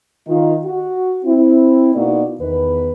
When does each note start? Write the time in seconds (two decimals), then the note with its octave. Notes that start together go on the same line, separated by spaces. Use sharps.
0.27 D#3 D#4 F4
0.65 F#4
1.25 C4 E4
1.95 B2 A#3 D#4 E4 F#4 D5
2.40 E2 D#3 B4